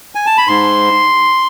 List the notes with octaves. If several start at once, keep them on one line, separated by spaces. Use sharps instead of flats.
G#5
A5
B5
G#2 C6